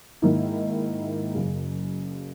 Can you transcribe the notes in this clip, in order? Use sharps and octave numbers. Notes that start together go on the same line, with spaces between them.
G#2 D#3 A#3 E4
F#1 F#2 C#3